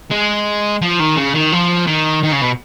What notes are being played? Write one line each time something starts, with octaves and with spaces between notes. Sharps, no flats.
G#3
F3
D#3
C#3
D#3
F3
D#3
D#3
C#3
B2